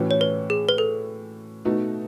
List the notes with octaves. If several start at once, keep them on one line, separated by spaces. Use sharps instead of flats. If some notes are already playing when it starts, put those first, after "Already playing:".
Already playing: A2 E3 A3 C#4 F#4
C#5
B4
G#4
B4
A4
B2 A3 D#4 F#4